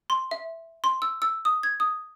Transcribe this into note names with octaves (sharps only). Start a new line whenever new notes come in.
C6
E5
C6
E6
E6
D#6
G#6
D#6